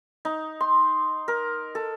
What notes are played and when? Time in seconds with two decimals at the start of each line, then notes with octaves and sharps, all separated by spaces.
0.25 D#4
0.60 C6
1.28 A#4
1.75 A4